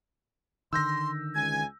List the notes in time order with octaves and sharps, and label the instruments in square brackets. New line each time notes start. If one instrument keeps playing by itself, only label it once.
[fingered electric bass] D3 D#3 [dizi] C6 [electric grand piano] E6 G6 A#6
[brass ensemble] C#2 G#5 [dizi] G#6